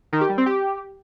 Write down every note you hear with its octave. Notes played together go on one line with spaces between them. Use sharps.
D#3
G4
G3
C4
G4